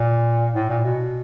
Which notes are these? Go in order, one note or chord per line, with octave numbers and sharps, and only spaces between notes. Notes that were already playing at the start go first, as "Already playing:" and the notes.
Already playing: A#2
A2
A#2
B2